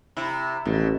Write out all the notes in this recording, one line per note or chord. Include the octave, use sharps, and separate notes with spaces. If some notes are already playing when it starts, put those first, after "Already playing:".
C3 E4
A1 B2